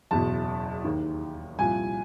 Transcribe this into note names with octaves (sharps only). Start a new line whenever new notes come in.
F#1 E2 B2 A5
D#2 D#3
C2 A#2 F3 G#5